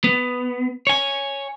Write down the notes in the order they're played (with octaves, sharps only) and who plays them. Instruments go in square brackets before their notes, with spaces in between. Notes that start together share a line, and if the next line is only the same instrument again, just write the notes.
[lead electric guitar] B3
C#5 G#5